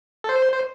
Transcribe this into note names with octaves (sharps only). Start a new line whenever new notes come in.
A4
C5
C5